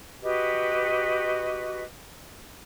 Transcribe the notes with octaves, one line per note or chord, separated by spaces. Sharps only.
F#4 G4 B4 D#5